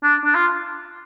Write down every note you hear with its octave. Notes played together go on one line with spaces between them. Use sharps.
D4
D4
F4